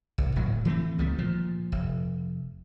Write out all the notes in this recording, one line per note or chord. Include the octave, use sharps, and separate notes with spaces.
C2
D1 A2 F#3
E3 A3 C4
C#2 D#3 G3 A3
A#2 F3
F1